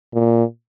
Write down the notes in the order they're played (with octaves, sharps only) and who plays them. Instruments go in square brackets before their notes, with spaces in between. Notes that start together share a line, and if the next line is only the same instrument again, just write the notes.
[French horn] A#2